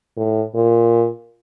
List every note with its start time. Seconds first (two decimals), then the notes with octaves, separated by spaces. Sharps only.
0.16 A2
0.54 A#2